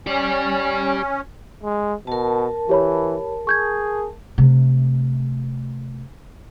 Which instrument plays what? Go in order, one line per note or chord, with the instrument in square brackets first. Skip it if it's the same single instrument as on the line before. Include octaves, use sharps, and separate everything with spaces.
[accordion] C#4 [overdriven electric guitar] G4 D5
[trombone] G#3
[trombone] B2 [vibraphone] A#4 A5
[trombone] E3 [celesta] G4 C#5 B5
[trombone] G#4 [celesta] C#6 G6 G#6
[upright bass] C3 A3